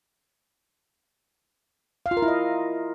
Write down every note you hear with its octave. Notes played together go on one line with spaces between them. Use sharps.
F5
F4
A#4
E4
D#5